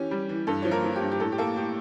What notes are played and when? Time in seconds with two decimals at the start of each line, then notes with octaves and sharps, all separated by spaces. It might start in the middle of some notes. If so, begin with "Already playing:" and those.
Already playing: E3 C#4 G4
0.11 G3
0.29 E3
0.47 G2 A4
0.62 F3 C#5
0.71 A#3 A#4
0.84 F3
0.96 G4
1.02 G2
1.11 G4
1.20 A2 A4
1.32 G4
1.38 A#3 A4
1.56 A2 G4